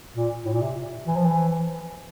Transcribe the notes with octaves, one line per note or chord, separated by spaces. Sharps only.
A#2
A2
A#2
C3
E3
F3
E3